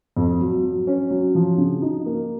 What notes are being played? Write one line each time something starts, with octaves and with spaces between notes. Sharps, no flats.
F2
F#3
F#3
C#4
F#3
F3
C#3
D#4
A#3